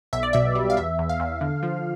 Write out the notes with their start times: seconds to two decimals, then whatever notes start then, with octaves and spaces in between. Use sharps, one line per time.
0.13 B1 E5
0.23 D5
0.33 B2 E5
0.55 G3
0.70 F5
0.77 E2 E5
0.99 E2
1.09 F5
1.20 E2
1.41 D3
1.63 F3